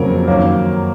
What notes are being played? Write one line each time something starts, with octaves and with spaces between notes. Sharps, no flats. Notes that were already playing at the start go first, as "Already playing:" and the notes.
Already playing: F2 C#3 F#3 A#3 C#4 A#4
F#2 D#3 A#3 C#4